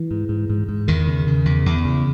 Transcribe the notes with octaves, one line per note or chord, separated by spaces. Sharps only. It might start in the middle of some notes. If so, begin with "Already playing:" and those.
Already playing: E3
G#2
G#2
G#2
G#2
E2 D#3
C#3
C#3
E2
E2
C#3